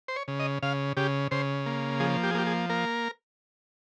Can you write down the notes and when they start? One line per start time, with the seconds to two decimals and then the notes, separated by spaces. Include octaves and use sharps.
0.08 C5
0.16 C#5
0.28 C#3
0.40 D#5
0.63 C#3 F5
0.97 C#3 G4
1.31 C#3 C5
1.66 A#3
2.00 F3 G#4
2.23 G4
2.30 G#4
2.35 A#3 G4
2.46 G#4
2.70 A#3 A#4